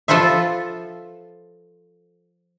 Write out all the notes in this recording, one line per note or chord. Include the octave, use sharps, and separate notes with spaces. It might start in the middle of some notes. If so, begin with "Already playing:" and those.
F3 F4 A4 B4 C5 E5